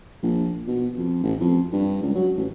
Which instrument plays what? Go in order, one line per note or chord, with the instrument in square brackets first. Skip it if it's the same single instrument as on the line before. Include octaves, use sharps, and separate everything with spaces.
[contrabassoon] A#1
B2
F2
A1
F2
G2
C#2
F#3
A1